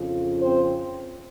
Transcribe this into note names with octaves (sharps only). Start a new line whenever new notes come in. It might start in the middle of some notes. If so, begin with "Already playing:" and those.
Already playing: F2 C#3 F3
C4 C5